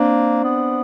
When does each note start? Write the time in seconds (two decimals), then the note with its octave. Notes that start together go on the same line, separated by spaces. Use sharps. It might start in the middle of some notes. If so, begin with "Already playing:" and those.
Already playing: A#3 C4 D4
0.44 B3